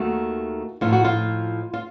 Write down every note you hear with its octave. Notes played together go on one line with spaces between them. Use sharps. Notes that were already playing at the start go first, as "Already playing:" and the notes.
Already playing: D#2 D#3 A3 F#4
A2 F3 A3 D#4 F4
F#4
F4
F4